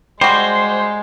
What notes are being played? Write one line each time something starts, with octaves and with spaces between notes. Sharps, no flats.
G3 G#3 F#4 C5